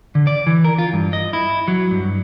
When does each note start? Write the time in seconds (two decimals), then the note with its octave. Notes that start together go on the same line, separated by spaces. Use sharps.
0.15 D3
0.27 D5
0.47 E3
0.64 A#4
0.79 F4
0.93 G2
1.13 D#5
1.33 E4
1.68 F#3
1.91 G2